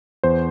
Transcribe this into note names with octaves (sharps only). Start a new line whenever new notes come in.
E2 C5